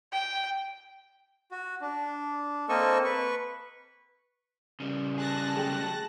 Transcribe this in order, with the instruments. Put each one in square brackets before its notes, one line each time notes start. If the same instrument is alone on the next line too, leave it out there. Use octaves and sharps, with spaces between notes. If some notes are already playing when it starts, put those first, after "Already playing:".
[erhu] G5
[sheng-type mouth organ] F#4
D4
A#3 C4 A4 D#5 C#6 E6
B4 C#6
[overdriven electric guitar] C#3 G3
[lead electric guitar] G#4 [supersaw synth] A5 F#6 A#6
[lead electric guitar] F#3 A3 [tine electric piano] G#4 G5